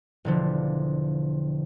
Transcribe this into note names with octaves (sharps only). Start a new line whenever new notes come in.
E1 D3 F3